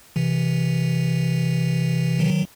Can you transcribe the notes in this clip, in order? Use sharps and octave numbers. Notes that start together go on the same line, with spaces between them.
C3 E3
D#3 F#3